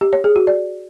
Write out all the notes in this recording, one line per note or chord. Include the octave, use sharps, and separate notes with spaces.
G4
C#5
G#4
F#4
D5